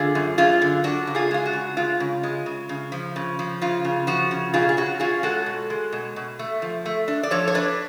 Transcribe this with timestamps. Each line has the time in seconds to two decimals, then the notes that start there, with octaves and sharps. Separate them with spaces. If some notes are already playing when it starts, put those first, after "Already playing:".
Already playing: D3 F4 G#4
0.15 F#2
0.38 F#2 F4 G#4
0.62 D3
0.84 D4 F#4
1.07 C#3
1.15 F4 G#4
1.31 G#3 F4
1.46 F#4
1.53 C#3
1.77 G#3 F4
2.00 C#3
2.23 G#3
2.46 C#3
2.69 C#3
2.92 F3
3.16 C#3
3.39 F3
3.62 C#3 F4
3.85 C#3
4.07 F3 F#4
4.31 C#3
4.54 B2 F4 G#4
4.69 G#4
4.77 C#4 F#4
5.00 C#4 F4 G#4
5.23 G#3 F#4 A4
5.46 B2
5.70 G#3
5.92 B2
6.16 B2
6.39 A3
6.62 F3
6.86 A3
7.08 D4
7.23 D5
7.31 F3 A4 C#5
7.48 C#5
7.54 D4 B4 D5